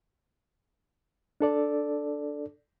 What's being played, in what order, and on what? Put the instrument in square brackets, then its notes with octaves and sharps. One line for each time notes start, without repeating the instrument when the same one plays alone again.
[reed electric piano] D4 A4 D5